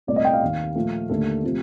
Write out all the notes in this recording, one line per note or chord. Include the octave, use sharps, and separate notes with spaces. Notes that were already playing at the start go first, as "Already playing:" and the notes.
C2 A#2 A3 D5
D#5
G5
F5
D#2 D#3 A#3
A#2 F3 A3
D#2 D3 A3 A4
C3 F3 A3